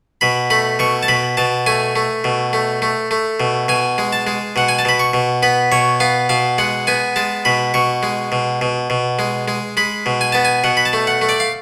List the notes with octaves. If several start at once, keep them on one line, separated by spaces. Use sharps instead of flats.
B2 B5
A3 B5
B2 C#6
A5
B2 B5
B2 A5
A3 G#5
A3
B2
A3
A3
A3
B2
B2 G#5
G#3
A5
G#3
B2 F#5
G#5
A5
B2 B5
C#6
B2
B3 B5
B2 C#5
B3 F5
B2 F5
G#3 F#5
B3 G#5
G#3 A5
B2 B5
B2 C#6
G#3
B2
B2
B2
G#3
G#3
G#3 B5
B2
G#5
B3 A5
G#5
B2 F#5
B5
A5
A3
F#5
A3
D5
F5